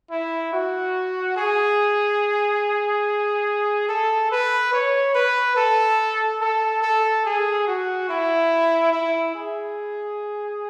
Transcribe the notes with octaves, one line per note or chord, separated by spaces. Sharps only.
E4
F#4
G#4
A4
B4
C#5
B4
A4
A4
A4
G#4
F#4
E4
E4
G#4